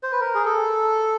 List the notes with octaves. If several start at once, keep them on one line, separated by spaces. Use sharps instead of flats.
C5
B4
A#4
G#4
A4